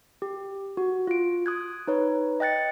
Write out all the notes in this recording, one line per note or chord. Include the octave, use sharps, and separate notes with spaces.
G4
F#4
F4 D7
D#6 F#6 G#6
D#4 B4 C#5
D#5 G5 F#6 A6 C#7